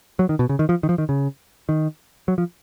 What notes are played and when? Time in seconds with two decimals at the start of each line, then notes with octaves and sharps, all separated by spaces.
0.19 F#3
0.29 D#3
0.39 B2
0.49 C#3
0.59 D#3
0.69 F3
0.83 D#3
0.89 F3
0.98 D#3
1.09 C#3
1.69 D#3
2.28 F#3
2.38 F3